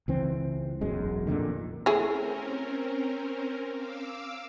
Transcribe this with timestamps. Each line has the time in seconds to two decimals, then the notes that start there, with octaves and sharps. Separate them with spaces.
0.08 C#2 E3 C4
0.81 E1 B1 F#2 G#3
1.27 F2 A#2 D3 D#3
1.86 A3 C4 C#4 E4 G#4 A#4
3.71 F5 D6 E6